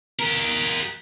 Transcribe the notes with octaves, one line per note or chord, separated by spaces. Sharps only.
G4 A#4